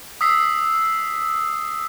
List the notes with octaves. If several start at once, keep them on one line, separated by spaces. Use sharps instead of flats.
D#6 E6 B6 C7